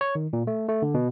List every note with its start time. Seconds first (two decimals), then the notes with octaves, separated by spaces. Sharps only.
0.01 C#5
0.15 D#3
0.33 A#2
0.47 A3
0.69 A3
0.82 D3
0.94 B2